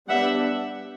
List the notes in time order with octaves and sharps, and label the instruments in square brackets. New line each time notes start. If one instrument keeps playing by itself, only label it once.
[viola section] G3 B3 D4 E5 F#5